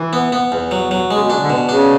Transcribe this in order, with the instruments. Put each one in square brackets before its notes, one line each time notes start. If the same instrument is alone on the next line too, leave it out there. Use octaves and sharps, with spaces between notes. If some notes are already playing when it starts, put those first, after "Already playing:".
Already playing: [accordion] E3
[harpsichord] B3
B3
E2
F#3
F#3
[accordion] C#3 [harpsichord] G#3
[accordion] B2
[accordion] C#3 [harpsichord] D4
[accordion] D3
[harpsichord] B2
[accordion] C#3 [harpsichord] D4